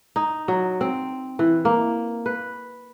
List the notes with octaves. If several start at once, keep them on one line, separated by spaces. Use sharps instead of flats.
D#4
F#3
C4
E3
A#3
B4